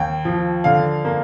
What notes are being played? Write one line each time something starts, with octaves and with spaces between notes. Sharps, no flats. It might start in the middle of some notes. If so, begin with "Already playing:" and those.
Already playing: D#2 G5
F3
D3 F5
A#3